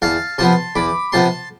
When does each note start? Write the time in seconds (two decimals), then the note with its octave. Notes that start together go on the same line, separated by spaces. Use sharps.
0.02 E2 F5 A5
0.38 C3 F3 B3 A5 C6
0.76 E2 B5 D6
1.12 C3 F3 B3 A5 C6